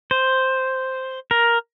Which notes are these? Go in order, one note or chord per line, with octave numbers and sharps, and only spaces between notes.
C5
A#4